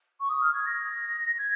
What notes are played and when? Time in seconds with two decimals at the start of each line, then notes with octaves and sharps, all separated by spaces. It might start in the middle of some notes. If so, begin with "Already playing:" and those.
0.20 C#6
0.29 D#6
0.41 F6
0.53 G#6
0.66 A#6
1.38 G#6